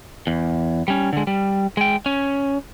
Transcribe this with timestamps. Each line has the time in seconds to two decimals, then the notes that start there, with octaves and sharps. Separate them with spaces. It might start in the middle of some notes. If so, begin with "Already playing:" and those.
0.27 E2
0.88 G3 C#4
1.13 D3 G#3
1.27 G3
1.77 G#3 G5
2.06 C#4